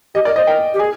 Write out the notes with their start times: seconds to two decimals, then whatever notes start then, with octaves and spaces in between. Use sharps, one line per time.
0.15 G4 D#5
0.25 A#4 D5
0.36 C5 D#5
0.47 A#4 G5
0.74 G4
0.79 G#4 G#5